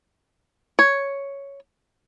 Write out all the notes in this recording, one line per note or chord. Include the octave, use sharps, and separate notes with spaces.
C#5